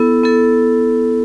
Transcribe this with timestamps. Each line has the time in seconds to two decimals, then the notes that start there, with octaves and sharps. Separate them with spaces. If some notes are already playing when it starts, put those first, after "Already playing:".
Already playing: B3 E4 A4
0.24 B3 E4 A4